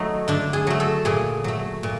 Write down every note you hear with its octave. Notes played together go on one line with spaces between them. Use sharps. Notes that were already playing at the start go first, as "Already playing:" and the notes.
Already playing: F#3 A3 D#4
D3 D4
G#4
F#3 A3
A4
A#2 G#4
F#3 A3
A#2